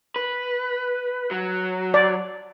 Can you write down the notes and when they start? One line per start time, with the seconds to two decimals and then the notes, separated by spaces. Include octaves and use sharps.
0.16 B4
1.31 F#3
1.94 D5